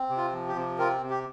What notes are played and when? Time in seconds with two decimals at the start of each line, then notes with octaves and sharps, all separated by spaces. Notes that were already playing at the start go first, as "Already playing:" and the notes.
Already playing: C4
0.09 C3
0.17 F4
0.32 F3
0.48 G4
0.56 C3
0.78 C4 F4 A#4
1.02 C3
1.10 G4